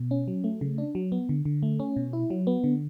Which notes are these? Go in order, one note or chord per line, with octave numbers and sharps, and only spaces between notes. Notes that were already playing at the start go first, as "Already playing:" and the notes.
Already playing: B2
C#4
F#3
A3
C#3
D4
F#3
B3
D3
D3
A3
C#4
B2
E4
F#3
B3
D3